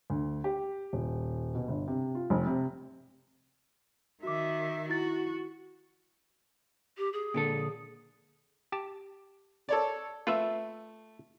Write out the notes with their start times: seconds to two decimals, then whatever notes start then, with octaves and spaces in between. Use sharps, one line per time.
0.10 D2
0.44 G4
0.93 D#1
1.55 B2
1.69 G1
1.88 C3
2.15 F4
2.30 F1
2.47 C3
4.23 D#3 F#4 E5 D6
4.89 E4 F#4 A6
6.98 G4
7.13 G#4
7.34 A#2 D3 A4
8.72 G4 A5
9.69 A4 C#5 D5
10.27 A3 F4 B4 E5